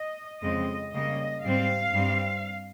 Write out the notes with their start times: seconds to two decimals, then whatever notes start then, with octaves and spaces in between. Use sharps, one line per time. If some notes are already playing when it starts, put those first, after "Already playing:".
Already playing: D#5
0.43 F2 C#3 G#3 C4 D#5
0.93 C#3 G3 A#3 D#5
1.44 G#2 G3 C4 F5
1.94 G2 G3 C4